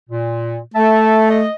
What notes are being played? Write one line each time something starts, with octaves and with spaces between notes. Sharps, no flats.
A#2
A3 E5 A5
D#5